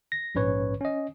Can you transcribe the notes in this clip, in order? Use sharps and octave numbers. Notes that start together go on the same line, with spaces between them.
A#6
A#1 G#2 C#4 B4 C#5
C#4 D#5